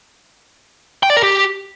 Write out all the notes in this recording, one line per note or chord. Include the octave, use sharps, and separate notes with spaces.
G5
D5
A#4
G4